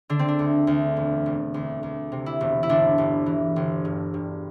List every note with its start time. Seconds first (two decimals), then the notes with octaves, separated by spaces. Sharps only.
0.09 D3 D4
0.19 C4
0.28 D4
0.39 D2
0.67 D2
0.97 E1
1.26 E1
1.54 D2
1.83 D2
2.12 C3
2.26 E4
2.41 E1
2.63 E4
2.69 G1 D4
2.98 G1
3.26 E3
3.56 G1
3.85 G2
4.14 G2